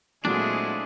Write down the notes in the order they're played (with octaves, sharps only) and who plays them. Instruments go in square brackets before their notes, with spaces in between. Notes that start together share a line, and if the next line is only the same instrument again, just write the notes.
[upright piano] A#2 F#3 [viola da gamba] G#3 C4 E4 [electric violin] A3 G#4 [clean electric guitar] D4